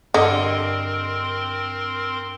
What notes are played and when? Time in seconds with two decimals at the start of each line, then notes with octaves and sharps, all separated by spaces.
0.14 G2 D3 C4 A#4 D#5 C6 C#7